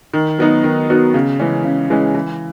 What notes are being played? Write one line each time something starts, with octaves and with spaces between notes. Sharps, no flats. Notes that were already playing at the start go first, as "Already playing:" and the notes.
D#3
F#3 B3 D#4 F#4
D#3
F#3 B3 D#4 F#4
C#3
E3 G#3 C#4
C#3
E3 G#3 C#4
E3